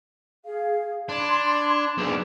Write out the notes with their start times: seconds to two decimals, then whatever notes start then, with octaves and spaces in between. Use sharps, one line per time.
0.43 G#4 F5
1.09 D4 B5 C6 G#6
1.98 B1 D4 G#4